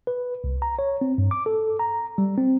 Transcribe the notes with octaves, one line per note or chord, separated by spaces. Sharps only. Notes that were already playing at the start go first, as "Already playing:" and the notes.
B4
C2
A#5
C#5
C4
G2
D6
A4
A#5
G3
C4